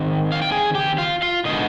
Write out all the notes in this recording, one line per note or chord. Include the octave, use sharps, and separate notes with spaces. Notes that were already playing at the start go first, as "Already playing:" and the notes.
Already playing: D#3 C4
F5
G5
G#4 G#5
G4 G5
F4 F5
F4 F5
D3 G#3 B3 D#4 D#5